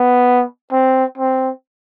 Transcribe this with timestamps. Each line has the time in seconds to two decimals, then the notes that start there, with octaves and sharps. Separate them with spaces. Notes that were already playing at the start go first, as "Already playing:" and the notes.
Already playing: B3
0.72 C4
1.18 C4